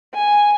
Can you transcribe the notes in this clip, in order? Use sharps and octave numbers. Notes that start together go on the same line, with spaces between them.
G#5